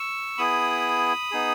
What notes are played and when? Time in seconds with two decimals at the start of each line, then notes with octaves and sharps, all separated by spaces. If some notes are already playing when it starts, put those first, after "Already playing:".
Already playing: C#6 E6
0.38 B3 E4 G#4 B5 D#6
1.31 B3 D#4 G#4